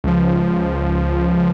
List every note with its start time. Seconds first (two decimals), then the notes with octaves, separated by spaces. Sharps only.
0.04 C#2 F3